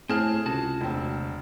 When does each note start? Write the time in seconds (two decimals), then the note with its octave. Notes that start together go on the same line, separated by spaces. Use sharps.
0.09 A2 C4 G#4 C5 A5 F6
0.46 C#2 C3 F#4 A5
0.81 E1 D2 C4